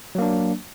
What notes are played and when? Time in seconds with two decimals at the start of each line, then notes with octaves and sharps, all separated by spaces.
0.15 F#3
0.18 A#3
0.22 D4